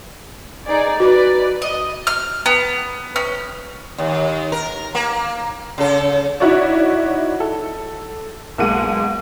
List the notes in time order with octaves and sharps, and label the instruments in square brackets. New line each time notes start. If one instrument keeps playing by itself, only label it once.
[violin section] D#4 G#4 D5
[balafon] F#4 [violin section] B4 D5
[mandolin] D#5
F6
B3
C#4
[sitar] D#2
A#4
A#3
C#3 A4
[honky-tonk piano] D#4 E4 F#4 C#5 D5
A4
B1 G#3 A#3 F#5 D#7